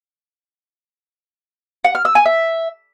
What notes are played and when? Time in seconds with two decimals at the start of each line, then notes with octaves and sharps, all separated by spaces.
1.84 F#5
1.95 F6
2.05 E6
2.15 G#5
2.25 E5